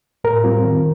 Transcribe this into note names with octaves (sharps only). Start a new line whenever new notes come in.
A2 A#4
G3 C4 F4
D#3